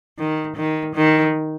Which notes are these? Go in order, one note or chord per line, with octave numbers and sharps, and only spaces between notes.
D#3
D#3
D#3